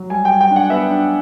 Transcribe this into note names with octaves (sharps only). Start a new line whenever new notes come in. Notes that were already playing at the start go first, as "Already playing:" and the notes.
Already playing: F#3
G3 G#5
G5
G3
G5
D4
F#5
B3 E5
D4